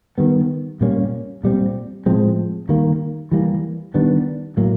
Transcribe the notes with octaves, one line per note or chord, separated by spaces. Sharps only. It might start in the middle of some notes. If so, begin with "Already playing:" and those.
D#3 G3 B3
A#2 G3 A#3 C#4
A#2 G3 C4
A2 F3 G#3 C4
D#3 G3 A#3
E3 G3 A#3
D#3 G3 B3 D4
A2 F#3 A#3